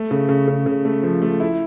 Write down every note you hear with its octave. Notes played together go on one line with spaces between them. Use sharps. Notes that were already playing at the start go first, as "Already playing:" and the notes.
Already playing: A3
C#3
C#3
C#3
C#3
A3
F3
A3
E4